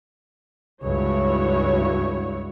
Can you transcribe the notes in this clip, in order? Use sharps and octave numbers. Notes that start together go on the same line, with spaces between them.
C#2 G2 E4 F#4 C#5